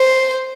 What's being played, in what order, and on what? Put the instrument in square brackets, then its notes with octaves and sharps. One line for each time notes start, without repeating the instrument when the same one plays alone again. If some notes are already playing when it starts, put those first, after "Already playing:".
Already playing: [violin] C5